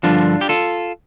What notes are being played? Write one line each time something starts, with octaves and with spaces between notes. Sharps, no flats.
G2 D3 F3 D4 F4
G4
F4 A4